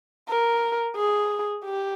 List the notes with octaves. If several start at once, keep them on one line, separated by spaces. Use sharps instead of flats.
A#4
G#4
G4